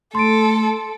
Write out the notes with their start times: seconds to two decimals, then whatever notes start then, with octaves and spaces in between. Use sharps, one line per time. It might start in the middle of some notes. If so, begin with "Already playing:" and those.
0.15 A3 A4 C6 A6 D7